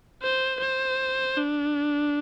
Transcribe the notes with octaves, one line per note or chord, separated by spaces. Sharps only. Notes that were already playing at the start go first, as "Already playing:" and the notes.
C5
C5
D4